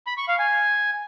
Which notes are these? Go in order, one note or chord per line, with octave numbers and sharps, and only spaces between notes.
B5
C#6
F5
G#5